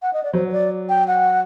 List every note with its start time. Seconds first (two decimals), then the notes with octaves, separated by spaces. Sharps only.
0.02 F#5
0.13 D#5
0.23 D5
0.33 F#3 C5
0.48 C5
0.52 D5
0.89 G5
1.08 F#5